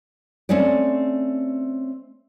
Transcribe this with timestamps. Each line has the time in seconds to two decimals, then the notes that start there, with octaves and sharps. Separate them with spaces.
0.49 A3 C4 C#4 D#4 D5